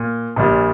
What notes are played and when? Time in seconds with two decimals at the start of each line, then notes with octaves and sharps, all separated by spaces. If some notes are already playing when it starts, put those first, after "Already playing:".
Already playing: A#2
0.36 A#1 A#2 G3